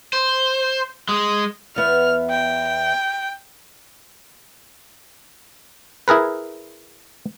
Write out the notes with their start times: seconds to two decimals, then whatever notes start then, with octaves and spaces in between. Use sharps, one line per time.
0.13 C5
1.09 G#3
1.76 E2 B3 E5 F6
2.30 G5
6.08 E4 G#4 A#4 B4